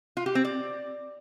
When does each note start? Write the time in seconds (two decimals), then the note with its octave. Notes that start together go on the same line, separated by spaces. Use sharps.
0.17 F4
0.26 G4
0.35 C4
0.44 D5